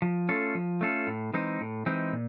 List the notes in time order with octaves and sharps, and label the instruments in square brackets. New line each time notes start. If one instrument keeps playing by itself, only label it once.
[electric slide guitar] F3
A3 C#4 F4 A4
F3
A3 C#4 F4 A4
A2
E3 G#3 C4 D#4
A2
E3 G#3 C4 D#4
A#2